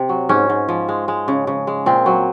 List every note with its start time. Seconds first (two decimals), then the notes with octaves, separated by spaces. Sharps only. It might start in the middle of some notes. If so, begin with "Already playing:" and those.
Already playing: C3
0.09 F#3
0.29 G#2 C#4
0.50 G#2
0.68 F3
0.89 G#3
1.08 G#3
1.28 C#3
1.47 C#3
1.67 G#3
1.86 A#2 C4
2.06 F#3